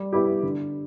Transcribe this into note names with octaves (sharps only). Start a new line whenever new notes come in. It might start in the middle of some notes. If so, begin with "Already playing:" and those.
Already playing: G3
B3 E4 G4
D3